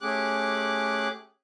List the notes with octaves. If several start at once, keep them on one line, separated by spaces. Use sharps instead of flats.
A3 C#4 G4 G#4 D6 F#6